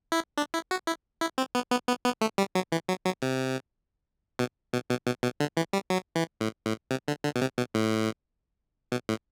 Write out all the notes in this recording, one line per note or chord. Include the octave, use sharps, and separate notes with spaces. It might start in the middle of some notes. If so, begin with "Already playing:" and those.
E4
D4
E4
F#4
E4
E4
C4
B3
B3
B3
B3
A3
G3
F#3
E3
F#3
F#3
C3
B2
B2
B2
B2
B2
D3
E3
G3
F#3
E3
A2
A2
C3
D3
D3
B2
C3
B2
A2
B2
A2